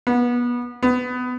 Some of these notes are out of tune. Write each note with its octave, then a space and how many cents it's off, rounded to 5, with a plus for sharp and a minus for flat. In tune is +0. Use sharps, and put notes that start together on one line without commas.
B3 -25
B3 +20